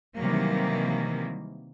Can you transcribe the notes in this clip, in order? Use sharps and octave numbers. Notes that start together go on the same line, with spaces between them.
C3 D#3 E3 F#3 G3 A#3